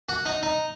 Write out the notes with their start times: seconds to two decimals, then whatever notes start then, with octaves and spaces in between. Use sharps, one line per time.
0.09 F#4
0.26 D#4
0.43 D#4